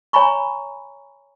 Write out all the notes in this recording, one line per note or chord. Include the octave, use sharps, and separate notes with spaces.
C#5 G#5 A#5 B5 C#6